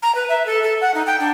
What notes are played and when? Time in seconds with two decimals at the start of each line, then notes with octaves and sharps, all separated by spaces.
0.02 A#5
0.15 B4
0.29 E5
0.46 A4
0.63 A4
0.81 F#5
0.94 D#4
1.07 G5
1.20 D4